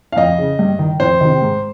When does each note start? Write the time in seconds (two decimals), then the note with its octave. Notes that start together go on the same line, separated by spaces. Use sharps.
0.12 F5
0.17 F2 D#5
0.38 C#3
0.59 G2
0.79 D#3
1.00 F2 C5
1.21 C3 D#3
1.41 G#2